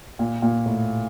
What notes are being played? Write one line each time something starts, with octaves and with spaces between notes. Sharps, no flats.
A#2
A#2
A2